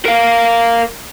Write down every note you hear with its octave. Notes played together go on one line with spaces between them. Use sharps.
A#4 F5